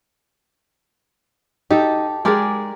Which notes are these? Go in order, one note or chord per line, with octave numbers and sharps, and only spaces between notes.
D#4 G4 A4
G#3 G4 G#4 A#4 D5